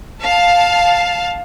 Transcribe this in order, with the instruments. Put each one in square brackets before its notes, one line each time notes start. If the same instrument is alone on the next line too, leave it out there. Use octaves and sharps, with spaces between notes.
[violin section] F5 A5